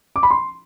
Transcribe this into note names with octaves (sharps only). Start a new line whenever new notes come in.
D6
B5
C6